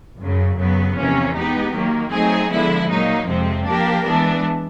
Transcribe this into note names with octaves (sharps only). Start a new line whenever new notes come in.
F#2 C#3 F#3
F#2 C#3 F#3 B3
E2 C3 F3 A#3 C#4
G#3 B3 D#4 G4
D#3 F#3 A#3
F#3 A3 C4 D#4 G#4
D3 F3 G#3 B3 E4
A#2 F#3 A#3 D#4
F2 C3 F3 G#3 C4
F3 A#3 D4 G4 A#4
E3 G#3 B3 D4